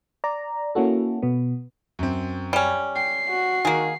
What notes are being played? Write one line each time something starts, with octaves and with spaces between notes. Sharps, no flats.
D5 A#5
A#3 C#4 E4 F#4 A4
B2 B3
F#2 C4
G3 C#4
G5 C7
F#4
D#3 A#3 G#4